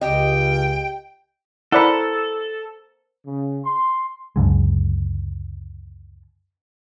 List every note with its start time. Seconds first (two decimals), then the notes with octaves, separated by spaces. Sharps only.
0.01 C#2 C#3 G4 D#5 G5
1.72 E4 A4 A#4 C5 D5 F#5 B5
3.25 C#3
3.63 C6
4.36 C#2 F#2 D3 G#3